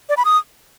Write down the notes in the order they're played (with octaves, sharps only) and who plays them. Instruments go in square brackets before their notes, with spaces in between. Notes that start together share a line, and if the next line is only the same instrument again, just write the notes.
[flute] D5
B5
D#6